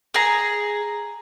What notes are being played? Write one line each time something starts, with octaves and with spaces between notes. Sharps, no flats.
G#4 A#5